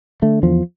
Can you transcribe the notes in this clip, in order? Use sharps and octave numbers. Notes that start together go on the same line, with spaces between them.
D3 A3
E2 F3